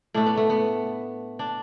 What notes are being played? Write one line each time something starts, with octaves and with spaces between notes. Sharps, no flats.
A2 A3 D4
B3
A3
B3
D4